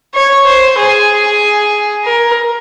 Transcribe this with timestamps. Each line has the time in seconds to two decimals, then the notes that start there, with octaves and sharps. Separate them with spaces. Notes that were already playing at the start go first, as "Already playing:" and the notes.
0.15 C#5
0.46 C5
0.78 G#4
2.04 A#4